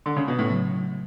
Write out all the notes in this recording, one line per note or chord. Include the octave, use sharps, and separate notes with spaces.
D3
C#3
B2
A2
C#3 F#3